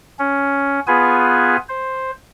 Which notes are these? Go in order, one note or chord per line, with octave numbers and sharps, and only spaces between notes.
C#4
B3 F4 G#4 B4 G#5
C5